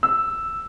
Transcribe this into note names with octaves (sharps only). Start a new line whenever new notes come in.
E6